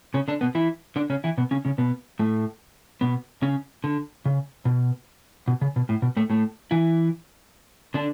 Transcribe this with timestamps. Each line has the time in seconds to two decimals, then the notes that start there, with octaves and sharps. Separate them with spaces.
0.14 C#3 C#4
0.28 D3 D4
0.41 B2 B3
0.55 E3 E4
0.96 D3 D4
1.10 C#3 C#4
1.24 E3 E4
1.38 B2 B3
1.51 C#3 C#4
1.65 C#3 C#4
1.78 B2 B3
2.19 A2 A3
3.01 B2 B3
3.42 C#3 C#4
3.84 D3
4.25 C#3
4.65 B2
5.48 B2
5.62 C#3
5.76 B2
5.89 A2
6.02 B2
6.17 A2 A3
6.30 A2 A3
6.71 E3 E4
7.94 D3 D4